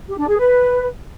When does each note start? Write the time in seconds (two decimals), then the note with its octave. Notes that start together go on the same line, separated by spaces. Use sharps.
0.07 G4
0.17 D4
0.27 G#4
0.37 B4